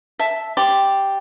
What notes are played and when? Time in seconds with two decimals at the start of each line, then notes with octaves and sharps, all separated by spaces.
0.19 E5 A5
0.57 G4 D5 C6